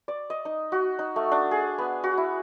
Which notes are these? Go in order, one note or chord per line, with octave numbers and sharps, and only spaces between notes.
D5
D#5
D#4
F#4
D#4
A3
D4
G#4
B3
F#4
E4